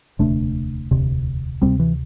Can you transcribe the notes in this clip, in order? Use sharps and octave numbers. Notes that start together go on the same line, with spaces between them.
E1 D2 C3 A3 D4
E1 D2 C3
D2 C3 G3 C4
E3